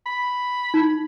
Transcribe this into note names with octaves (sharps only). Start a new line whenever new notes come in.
B5
D#4